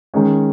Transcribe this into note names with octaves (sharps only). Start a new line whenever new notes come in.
D#3 G#3 C#4